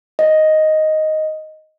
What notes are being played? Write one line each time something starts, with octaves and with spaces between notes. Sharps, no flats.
D#5